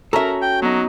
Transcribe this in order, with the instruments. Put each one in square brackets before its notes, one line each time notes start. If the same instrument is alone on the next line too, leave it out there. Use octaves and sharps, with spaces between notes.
[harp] C#4 F#4 A#5 [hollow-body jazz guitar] A4 E5 [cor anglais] A#4
[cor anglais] G5
[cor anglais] F#3 [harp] B3 D#4